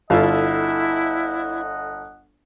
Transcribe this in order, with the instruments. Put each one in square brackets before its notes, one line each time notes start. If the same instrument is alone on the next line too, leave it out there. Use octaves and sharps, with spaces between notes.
[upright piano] G1 [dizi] E4 [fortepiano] F4 A4 F5 [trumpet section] D#5 F#5